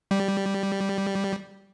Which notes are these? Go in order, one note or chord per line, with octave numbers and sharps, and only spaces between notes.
G3